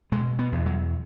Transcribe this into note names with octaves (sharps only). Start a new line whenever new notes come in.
B2 G#3
B3
E2
F#3